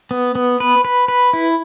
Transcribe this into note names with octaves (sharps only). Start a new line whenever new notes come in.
B3
B3
B4
B4
B4
E4